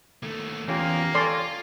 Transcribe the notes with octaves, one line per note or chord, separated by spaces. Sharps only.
D#2 A3
E2 A#3 C#4 F4 G4
F4 A4 C#5 D5 G#5 C6